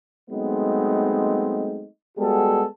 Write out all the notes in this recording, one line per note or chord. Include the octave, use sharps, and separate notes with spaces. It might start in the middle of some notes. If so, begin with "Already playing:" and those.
F#3 G#3 A3 B3 C4 D#4
G3 G#3 B3 F#4 G#4 A4